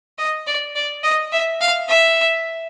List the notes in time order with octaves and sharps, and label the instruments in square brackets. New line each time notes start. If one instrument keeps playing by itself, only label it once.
[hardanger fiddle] D#5
D5
D5
D#5
E5
F5
E5